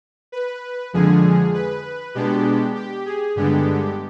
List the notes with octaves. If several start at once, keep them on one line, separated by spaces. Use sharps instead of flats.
B4
F2 D3 F3 G#3 G#4
B4
B2 G#3 B3 D4 G4
G4
G#4
G2 D3 G#3 B3 D4 G4